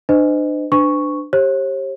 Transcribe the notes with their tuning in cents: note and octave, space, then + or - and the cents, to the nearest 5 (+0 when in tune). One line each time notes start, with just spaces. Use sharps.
D4 +35 C5 -40 D#5 +0
D4 +15 B4 +45 C#6 +0
G4 +0 C#5 -45